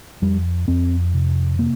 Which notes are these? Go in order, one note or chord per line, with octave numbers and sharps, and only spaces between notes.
F2 G3
F2 C4
C3
C3 A#3